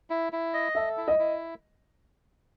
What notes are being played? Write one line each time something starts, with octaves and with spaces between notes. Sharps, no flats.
E4
E4
D#5
A4 E5
E4
D#5
E4